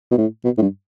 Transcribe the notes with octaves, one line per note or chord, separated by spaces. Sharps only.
B2
A2
B2
A2
G2